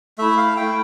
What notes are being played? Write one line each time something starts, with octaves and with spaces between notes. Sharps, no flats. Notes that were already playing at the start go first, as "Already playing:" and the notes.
A3 E4 E5
F5
A3 E4 G5